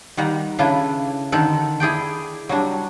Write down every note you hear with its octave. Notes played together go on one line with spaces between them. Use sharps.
D#3 G3 F#5 A#5
C#3 D4 E4 A4 B4
D3 D#3 A4 F#5
E4 G#4 D5 G5
F#3 G3 D4